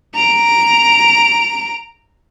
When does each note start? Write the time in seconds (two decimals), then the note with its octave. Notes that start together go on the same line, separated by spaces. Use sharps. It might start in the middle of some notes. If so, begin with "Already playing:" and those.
0.15 A#5 D7